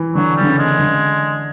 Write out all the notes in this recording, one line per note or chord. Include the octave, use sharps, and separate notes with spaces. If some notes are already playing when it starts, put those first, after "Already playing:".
Already playing: E3
D3 F#3
D3 G3
C#3
G#3
D3